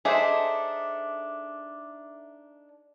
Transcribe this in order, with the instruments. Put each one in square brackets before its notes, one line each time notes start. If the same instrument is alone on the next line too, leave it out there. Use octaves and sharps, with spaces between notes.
[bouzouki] D4 D#4 A4 [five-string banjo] G#4 C5 [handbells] E5 [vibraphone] D6